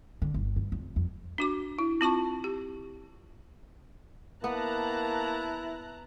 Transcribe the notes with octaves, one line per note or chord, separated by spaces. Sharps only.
D3
G1
G2
F1
F2
D4 F#4 D6
E4
C4 F4 A5 C#6
G4
A#3 B3 E4 A5 A#5 F#6